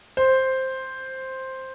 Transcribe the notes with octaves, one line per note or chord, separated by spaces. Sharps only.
C5